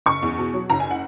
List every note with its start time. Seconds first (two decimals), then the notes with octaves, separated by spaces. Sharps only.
0.06 F#1 C#6
0.22 E2
0.38 B2
0.54 F#3
0.70 F#1 A#5
0.80 G#5
0.91 F#5